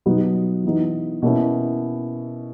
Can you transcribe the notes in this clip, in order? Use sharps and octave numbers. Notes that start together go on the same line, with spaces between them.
B2 F#3 B3 D#4 F#4
E3 B3 D#4
B2 A#3 C#4 E4